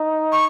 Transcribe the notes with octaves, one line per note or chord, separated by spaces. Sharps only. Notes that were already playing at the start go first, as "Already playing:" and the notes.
Already playing: D#4
C#6